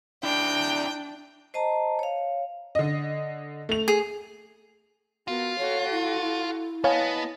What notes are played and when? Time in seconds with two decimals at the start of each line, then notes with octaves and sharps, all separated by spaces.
0.24 D4 E4 D5 G5
1.54 C5 D#5 A5 A#5
1.99 C#5 F5
2.75 D3 D#5
3.69 A3 F7
3.88 G#4
5.28 B3 F4 F#4 A#4
5.58 F#4 A4 C#5
5.92 E4
6.22 E4
6.84 B3 C#5 D#5 F5 G#5 A5